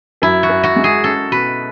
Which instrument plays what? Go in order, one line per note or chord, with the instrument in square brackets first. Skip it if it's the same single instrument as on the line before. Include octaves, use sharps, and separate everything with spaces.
[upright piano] F#2 [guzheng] E4
[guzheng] F#4
[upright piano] F#2
[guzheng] F#4
[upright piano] G#3
[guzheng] G#4
[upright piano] C#4 [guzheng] A4
[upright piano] B2 [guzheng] B4